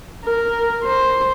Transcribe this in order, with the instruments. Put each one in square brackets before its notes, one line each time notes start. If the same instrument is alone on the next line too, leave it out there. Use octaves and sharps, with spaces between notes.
[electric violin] A#4
C5